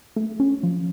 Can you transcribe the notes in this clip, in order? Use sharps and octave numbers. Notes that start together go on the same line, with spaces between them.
A3
C#4
F3